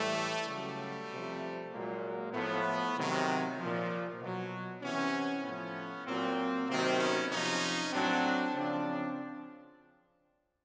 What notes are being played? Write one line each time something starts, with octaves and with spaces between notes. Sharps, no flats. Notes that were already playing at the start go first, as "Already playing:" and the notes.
Already playing: A2 E3 G3 A3
C#3 F#3 G3 A3
C3 F3
A#2 F#3 G#3 A#3
A2 F3 A3 B3
C3 D#3 F#3
A#2 F3
B2 F#3
C3 E3 B3 C#4
A2 F3 B3 C#4
A#2 F#3 A#3 C4
C3 D#3 F#3 A#3 C4
B3 C#4
C3 F3 C#4 D#4
A2 F#3 C4 D4
C#3 F3 C4 D4